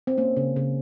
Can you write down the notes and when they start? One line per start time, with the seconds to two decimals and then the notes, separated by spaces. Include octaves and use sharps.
0.07 C4
0.18 A#3 C#4
0.37 C#3
0.56 C#3